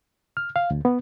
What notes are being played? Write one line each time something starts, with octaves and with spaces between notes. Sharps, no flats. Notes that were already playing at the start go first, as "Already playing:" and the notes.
F6
F5
D2
B3